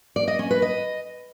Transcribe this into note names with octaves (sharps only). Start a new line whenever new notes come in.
D5
D#5
C#4
B4
D#5